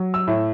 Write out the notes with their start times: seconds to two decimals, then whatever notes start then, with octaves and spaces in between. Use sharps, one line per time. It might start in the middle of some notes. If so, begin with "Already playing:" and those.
Already playing: F#3
0.14 E6
0.27 A2